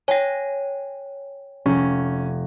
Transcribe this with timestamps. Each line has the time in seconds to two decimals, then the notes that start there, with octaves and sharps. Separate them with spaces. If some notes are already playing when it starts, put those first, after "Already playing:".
0.08 C#5 G5 G#5 A#6
1.66 F1 C#4